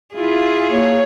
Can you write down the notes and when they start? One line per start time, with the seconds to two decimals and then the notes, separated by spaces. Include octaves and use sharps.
0.15 E4 F4 G#4
0.70 A#3 C#5